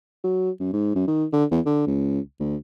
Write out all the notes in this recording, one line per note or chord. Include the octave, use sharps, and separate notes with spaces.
F#3
F#2
G#2
F#2
D#3
D3
E2
D3
C#2
D2